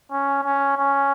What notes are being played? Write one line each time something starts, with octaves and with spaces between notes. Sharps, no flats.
C#4
C#4
C#4